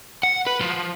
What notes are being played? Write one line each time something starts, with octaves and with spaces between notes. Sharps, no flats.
F#5
B4
F3